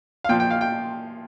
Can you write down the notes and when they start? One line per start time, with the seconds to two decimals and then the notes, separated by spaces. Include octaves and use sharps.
0.24 F5
0.29 A#2 F3 G5
0.40 G5
0.50 F5
0.61 G5